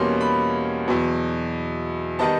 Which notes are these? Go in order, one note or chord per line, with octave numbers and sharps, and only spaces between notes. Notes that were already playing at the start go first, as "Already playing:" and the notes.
Already playing: E2 B2 G3 A#3 C#4 C6
B5
E2 B2 F#3
D#3 G3 B3 D#4 A5